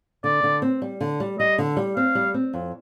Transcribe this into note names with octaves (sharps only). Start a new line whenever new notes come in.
D3 D5
D3
C4
G3
D3
G3
G3 D#5
D3
G3
C4 F5
G3
C4
F2